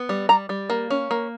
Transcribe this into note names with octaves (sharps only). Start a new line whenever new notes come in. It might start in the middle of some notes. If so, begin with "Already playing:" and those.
Already playing: B3
G3
G3 A#5
G3
A#3
C#4
A#3